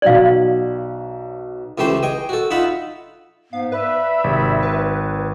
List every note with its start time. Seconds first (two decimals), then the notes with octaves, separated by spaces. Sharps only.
0.02 B1 F#3 D5 F5 F#7
1.78 C#2 E3 A3 G4 C5 C6
2.03 D#5 G5 G#5
2.29 F#4 A4
2.51 D#4 F4 E5 F#5 B5
3.53 G#2 B3 F5
3.72 B4 D5 E5 B5
4.24 G#1 C3
4.62 B4